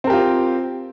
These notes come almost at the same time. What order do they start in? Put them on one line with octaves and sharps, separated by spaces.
C4 A#4 G4 F4